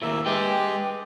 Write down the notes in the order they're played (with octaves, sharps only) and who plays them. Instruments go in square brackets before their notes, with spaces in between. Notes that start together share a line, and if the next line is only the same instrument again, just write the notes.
[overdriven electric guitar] D#2 A2 [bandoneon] A#3 E5
[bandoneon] G#3 G4 [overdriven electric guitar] B4 G5